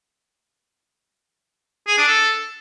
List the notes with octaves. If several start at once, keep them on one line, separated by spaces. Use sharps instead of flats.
G#4
D4
A4